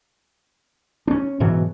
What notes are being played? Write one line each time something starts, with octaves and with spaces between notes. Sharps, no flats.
C#4 D4
G#2 B2 E3 F#3